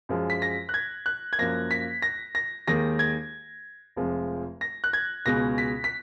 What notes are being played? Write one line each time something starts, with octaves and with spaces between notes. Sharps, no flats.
F#2 F3 G#3
B6
A#6
F#6
G#6
F#6
G#6
F#2 F3 A#3 A#6
B6
A#6
A#6
D#2 D#3 G#3 A#6
G#6
F1 F2 F3 G#3
A#6
F#6
G#6
C#2 B2 G#3 A#6
B6
B6